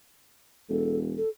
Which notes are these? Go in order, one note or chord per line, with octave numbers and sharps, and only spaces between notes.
E1 A4
A4